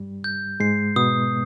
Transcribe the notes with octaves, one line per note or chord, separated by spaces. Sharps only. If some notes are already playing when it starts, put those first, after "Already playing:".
Already playing: G2 G3
G6
G#2 G#3 C7
B2 B3 D#6